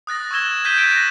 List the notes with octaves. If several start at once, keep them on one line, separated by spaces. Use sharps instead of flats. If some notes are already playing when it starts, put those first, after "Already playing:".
D#6 F#6 A6 A#6
C#6 E6 G#6 E7 G7
F#6 G6 B6 D#7 E7 G7
G6 A6 D7
A#6